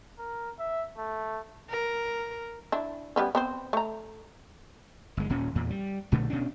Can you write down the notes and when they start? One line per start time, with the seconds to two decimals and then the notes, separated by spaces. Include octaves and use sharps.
0.19 A#4
0.59 E5
0.98 A3
1.70 A#4
2.72 D4 E4
3.16 G3 B3 C#4
3.35 B3 C4 C5
3.73 A3 A#5
5.17 G1 G#3
5.29 D#1 A#2 C#4
5.55 E2 A#2
5.70 G3
6.12 B1 A#2 D3 A3
6.30 B2 C#4 D4